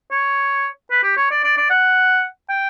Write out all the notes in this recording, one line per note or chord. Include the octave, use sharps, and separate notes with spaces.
C#5
B4
G4
C#5
D5
D5
D5
F#5
G5